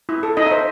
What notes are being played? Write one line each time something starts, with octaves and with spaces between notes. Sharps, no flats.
E4
A4
D#4 D#5
E5
C5